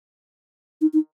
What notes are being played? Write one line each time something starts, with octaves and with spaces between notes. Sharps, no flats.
D#4
D#4